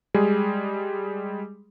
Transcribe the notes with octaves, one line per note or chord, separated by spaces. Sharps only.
G3 G#3 G#4